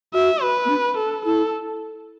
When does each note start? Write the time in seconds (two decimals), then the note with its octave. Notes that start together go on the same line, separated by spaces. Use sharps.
0.14 F#4 E5
0.42 B4
0.65 B3
0.69 D4
0.98 A4
1.25 E4 A4